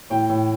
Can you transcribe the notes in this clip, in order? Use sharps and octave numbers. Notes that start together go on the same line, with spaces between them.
A2 G5
A2